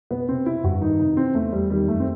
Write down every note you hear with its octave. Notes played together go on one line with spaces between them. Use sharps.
B2 B3
C3 C4
C3 E4
G2 F#4
D#3 D#4
C3 D#4
E3 C4
E2 A3
E2 G3
D#3 G3
F#2 A3
C4